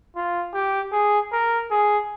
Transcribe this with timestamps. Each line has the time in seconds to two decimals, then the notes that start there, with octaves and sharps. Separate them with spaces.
0.16 F4
0.54 G4
0.92 G#4
1.32 A#4
1.71 G#4